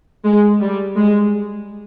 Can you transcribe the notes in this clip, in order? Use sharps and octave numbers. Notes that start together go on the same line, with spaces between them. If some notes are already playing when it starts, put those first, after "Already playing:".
G#3
G3
G#3